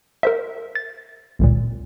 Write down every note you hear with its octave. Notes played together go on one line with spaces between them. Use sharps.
A#4 C5 E5
A6
G#1 C#2 A#2